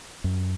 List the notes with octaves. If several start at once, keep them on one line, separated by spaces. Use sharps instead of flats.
F#2